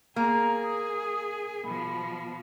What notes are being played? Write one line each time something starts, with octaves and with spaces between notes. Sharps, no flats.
A#3 G#4 A#5
D#6
B2 F3 B5